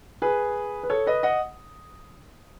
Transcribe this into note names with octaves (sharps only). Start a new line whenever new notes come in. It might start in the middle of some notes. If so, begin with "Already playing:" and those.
G#4 B4
B4
A4 C#5
B4 D#5
D#5 F#5